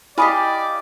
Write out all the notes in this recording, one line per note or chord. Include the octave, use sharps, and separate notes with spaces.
E4 G4 D5 D#5 F5 G#5 B5